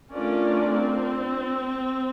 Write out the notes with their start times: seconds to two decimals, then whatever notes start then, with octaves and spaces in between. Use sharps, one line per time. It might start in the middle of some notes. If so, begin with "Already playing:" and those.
0.12 A3 C#4 D4 F4 A#4 D5
0.73 C4